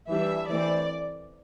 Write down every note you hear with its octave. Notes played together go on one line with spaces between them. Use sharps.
E3 G3 D4 E5
E3 A3 C4 D5